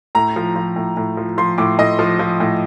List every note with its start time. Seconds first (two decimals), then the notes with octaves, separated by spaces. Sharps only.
0.15 A2 A#5
0.36 F3
0.56 F3
0.76 A2
0.97 A2
1.17 F3
1.38 F3 C6
1.58 A2 D6
1.79 A2 D#5
1.99 F3
2.19 F3
2.40 A2